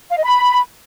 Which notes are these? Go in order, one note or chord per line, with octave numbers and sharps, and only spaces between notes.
F5
D#5
B5